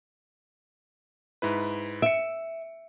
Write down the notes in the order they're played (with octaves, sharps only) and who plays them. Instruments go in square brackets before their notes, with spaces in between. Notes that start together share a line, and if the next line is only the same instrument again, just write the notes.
[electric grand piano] G#2 E4 B4
[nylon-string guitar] E5 [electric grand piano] C#7 D7